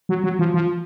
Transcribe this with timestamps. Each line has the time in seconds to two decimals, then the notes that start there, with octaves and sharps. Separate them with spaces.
0.09 F#3
0.24 F#3
0.39 F3
0.54 F3